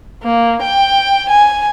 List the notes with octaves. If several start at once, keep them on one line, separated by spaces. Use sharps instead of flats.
A#3
G5
G#5